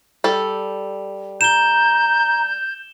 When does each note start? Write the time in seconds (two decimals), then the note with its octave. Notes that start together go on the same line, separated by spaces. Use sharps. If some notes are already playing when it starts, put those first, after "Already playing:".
0.24 G3 A4
1.41 A#5 G6 E7 G7